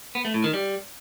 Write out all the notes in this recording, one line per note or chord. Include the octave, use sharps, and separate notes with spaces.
B3
A3
A2
D#3
G3